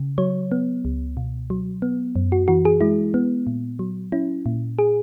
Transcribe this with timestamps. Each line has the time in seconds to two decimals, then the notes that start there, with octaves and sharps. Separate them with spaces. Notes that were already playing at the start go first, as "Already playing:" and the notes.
Already playing: C#3
0.18 F#3 C#5
0.52 B3
0.85 C#2
1.17 B2
1.50 F#3
1.82 B3
2.16 F#2
2.32 F#4
2.48 E3 F#4
2.65 G#4
2.81 G#3 E4
3.14 B3
3.47 A#2
3.79 F#3
4.12 C#4 E4
4.46 A#2
4.79 G#4